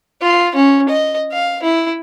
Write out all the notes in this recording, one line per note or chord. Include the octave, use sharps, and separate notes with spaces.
F4
C#4
D#5
F5
E4